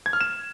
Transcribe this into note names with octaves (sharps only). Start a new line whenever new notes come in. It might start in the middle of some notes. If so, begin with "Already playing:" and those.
G#6
F6
E7